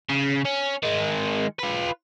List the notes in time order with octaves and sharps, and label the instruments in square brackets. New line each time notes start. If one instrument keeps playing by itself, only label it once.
[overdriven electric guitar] C#3
C#4
D#3 G#3
F4 B4